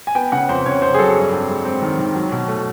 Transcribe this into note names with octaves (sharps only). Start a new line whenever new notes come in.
G#5
B3 G5
C#3 F#5
F2 C5
C#3 C#5
F2 C5
G#4
F#3 A4
G2
C4
G#3
C4
D#3
D#3
F#3
B2
A3